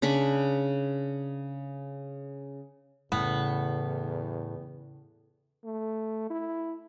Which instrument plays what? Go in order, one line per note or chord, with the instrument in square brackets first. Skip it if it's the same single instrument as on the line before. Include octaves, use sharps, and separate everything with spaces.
[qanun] C#3 D4 B5 C#6
[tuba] E2 [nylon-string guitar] A2 [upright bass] C#3 [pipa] B3
[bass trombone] A3
E4